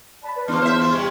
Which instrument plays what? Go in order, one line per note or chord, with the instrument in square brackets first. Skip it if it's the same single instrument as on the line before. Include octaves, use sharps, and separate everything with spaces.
[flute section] D5 A5 B5
B4 D5
[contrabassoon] E2 [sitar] E3 D4 [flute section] C6 F6
[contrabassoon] E2 [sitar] C5 E5
[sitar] F3
C3 G3